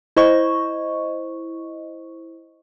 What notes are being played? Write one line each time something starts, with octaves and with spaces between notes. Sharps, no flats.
E4 C5 D#5 C#6